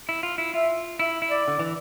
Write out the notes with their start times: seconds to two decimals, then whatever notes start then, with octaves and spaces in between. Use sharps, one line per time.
0.09 E4
0.23 F4
0.38 E4
0.54 F4 E5
0.99 E4 E5
1.22 E4
1.30 D5
1.48 D3
1.59 E3